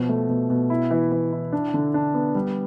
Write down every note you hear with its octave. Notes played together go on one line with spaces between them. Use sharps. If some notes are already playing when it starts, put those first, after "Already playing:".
Already playing: B2 F3
A3
B2
B2
E4
E3
E3
E4
D4
D3
D4
B3
G3